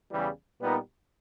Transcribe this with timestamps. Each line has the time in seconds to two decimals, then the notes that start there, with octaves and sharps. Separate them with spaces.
0.11 E2 C#3 E3 G3
0.60 A#2 G3 B3 D#4 A#4